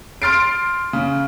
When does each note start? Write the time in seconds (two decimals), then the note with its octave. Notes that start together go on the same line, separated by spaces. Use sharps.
0.22 C6 F6 A6 C7 D7
0.93 C#3